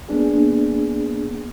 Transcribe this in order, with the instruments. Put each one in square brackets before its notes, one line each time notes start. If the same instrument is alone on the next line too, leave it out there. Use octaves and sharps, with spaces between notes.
[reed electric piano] A#3 B3 D4 G#4